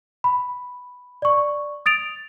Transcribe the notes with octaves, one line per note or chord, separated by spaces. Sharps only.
B5
D5 C#6
D#6 A6 D7 F7